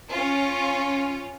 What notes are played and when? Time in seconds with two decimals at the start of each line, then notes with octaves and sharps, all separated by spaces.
0.12 C#4 F4